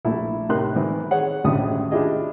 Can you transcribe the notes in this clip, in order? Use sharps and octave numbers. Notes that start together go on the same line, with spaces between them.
A#1 A3 A#3 E4
A2 C3 D#4 A#4 C6 F#6
D#3 E3 C4 E4
G#4 C#5 F#5
G#1 D#2 A2 C#3 D4 D#6
D4 E4 F4 G4 G#4 D#5